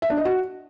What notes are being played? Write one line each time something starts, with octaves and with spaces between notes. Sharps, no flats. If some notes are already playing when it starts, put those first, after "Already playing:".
E5
D4
D#5
F#4